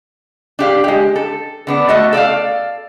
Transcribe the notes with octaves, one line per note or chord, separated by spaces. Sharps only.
D4 G4 F5
G#3 G4
A4
D3 B3 D4
A3 F#4 D#5 A5
A4 D5 E5 F5